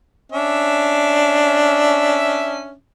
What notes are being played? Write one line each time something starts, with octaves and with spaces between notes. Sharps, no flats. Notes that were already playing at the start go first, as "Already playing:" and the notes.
C#4 D4 E5